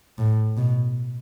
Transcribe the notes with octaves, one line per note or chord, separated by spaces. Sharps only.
A2
B2